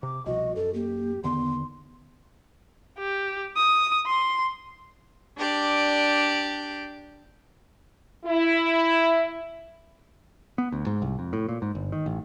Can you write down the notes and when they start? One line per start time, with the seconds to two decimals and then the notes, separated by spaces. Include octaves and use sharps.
0.03 C3 D6
0.26 C2 B2 F3 F#4 D#5
0.56 F#2 A4
0.74 A#3 G4
1.24 E2 D3 D#3 B3 C6
2.98 G4
3.57 D#6
4.07 C6
5.38 D4 G4 D5
8.25 E4
10.58 B3
10.72 D2
10.86 G#2
11.02 C2
11.19 F2
11.33 A2
11.49 A#2
11.62 G#2
11.75 G1
11.92 D#3
12.06 A1